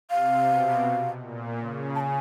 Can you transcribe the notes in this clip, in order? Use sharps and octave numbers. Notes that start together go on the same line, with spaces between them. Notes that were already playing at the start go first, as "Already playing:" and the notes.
C3 F5
B2
A#2
C#3
A5
G#5